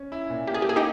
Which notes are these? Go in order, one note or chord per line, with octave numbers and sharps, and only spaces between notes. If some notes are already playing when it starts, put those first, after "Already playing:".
Already playing: C#4
E4
A#2
A#3 G4
G#4
G4
A#3 G#4
D#4 G4